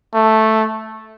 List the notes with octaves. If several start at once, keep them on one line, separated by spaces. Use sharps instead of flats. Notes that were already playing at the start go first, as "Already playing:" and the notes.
A3